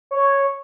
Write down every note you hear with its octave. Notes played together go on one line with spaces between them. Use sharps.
C#5